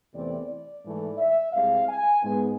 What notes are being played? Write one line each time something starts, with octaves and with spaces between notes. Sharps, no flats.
E2 C3 E3 A3 C4 D5
D5
G#2 E3 A3
E5
C2 C3 G#3 F5
G#5
G#2 G#3 B3